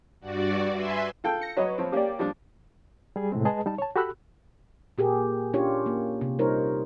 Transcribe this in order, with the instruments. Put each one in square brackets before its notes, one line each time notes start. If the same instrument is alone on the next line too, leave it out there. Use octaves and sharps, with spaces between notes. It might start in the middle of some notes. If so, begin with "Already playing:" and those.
[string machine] G2 F#4 D5
B4 E5 G#5 C6
[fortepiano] F4 A4 G5
[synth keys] A#6 C#7
[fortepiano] F#3 D#5 [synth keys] B4 C#5
[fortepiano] F3 C4
[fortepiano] A#3 C#4 [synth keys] G4 D5
[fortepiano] F3 G3 D4
[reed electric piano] G3 G#4
A2 C3 G#3 C4
G#3 G#4 B4 D#5 A5
G3 D#4 A5
C#5 A5
F#4 G4 A4 B5 E6 F#6
[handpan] A#2 G4 G#4 A#4
C#4 D4 F4 G4 C#5
A#3
C3
G3 D#4 F4 A#4 C5 C#5